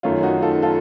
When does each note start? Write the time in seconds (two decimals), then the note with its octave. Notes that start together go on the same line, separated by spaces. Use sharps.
0.03 F#2 D#3 A3 C#4 F4
0.23 D#4 F#4
0.42 F4 A4
0.62 F4 A4